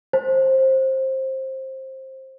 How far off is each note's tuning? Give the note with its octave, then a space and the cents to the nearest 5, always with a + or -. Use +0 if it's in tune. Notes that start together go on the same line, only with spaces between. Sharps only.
C5 +20